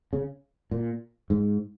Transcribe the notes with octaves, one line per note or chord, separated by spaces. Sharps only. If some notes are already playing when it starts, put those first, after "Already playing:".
C#3
A#2
G#2